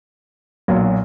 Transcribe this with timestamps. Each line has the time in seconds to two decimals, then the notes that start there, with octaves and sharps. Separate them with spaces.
0.68 B1 A#2 F#3